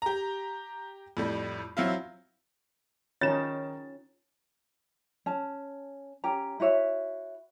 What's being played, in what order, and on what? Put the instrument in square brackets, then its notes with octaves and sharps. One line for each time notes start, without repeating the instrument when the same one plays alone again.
[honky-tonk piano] G4 A#5
F2 A2 G3
F#3 C4 E4 F4
[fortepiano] D#3 [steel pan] C#4 D#4 [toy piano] F4 C#5 [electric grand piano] A6 E7
[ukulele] C#4 A5
C#4 G4 A#5
E4 F#4 C#5 E5